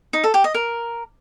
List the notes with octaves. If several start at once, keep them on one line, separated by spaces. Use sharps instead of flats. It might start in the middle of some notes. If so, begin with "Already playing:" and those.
D#4
A4
G4
D#5
A#4